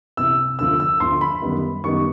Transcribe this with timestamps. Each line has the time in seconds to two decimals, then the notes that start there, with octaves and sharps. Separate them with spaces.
0.17 C2 C3 E3 E6
0.59 D2 D3 F3 E6
0.80 E6
1.00 D2 D3 F3 C6
1.21 B5
1.42 F#2 D#3 G3 B3 D#4
1.84 F#2 D#3 G3 B3 D#4 C#6